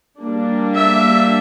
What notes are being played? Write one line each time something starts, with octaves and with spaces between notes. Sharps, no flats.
G3 A#3 D4
E5